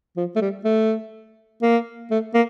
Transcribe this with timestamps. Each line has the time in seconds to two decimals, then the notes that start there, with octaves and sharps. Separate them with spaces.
0.17 F3
0.36 A3
0.41 G3
0.64 A3
1.62 A#3
2.11 A3
2.34 A#3